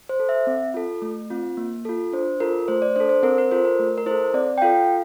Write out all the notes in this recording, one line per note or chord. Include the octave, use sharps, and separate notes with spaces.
C5
A4
E5
C4
F4 A4
A3
C4 F4
A#3
F4 A4
D4 C5
F4 A4 A#4
A3 C5
D5
D4 A4 C5
C5
C4 A#4
A#4
F4 A4 C5
A#4
A3
A#4
E4 A4 C5
C4 D5
G5
F4 A4 F5